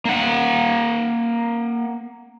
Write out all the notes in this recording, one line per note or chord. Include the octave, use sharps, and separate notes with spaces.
A#3 F#5